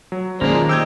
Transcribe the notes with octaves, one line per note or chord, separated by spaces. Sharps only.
F#3
D#3 G#3 A#3 C#4 D4 C5
F4
D#4 G4 E6 G6 G#6